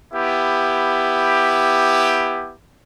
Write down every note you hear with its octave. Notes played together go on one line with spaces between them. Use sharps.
B3 E4 G4